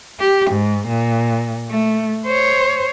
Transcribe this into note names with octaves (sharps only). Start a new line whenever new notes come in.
G4
G#2
A#2
A3
C5 C#5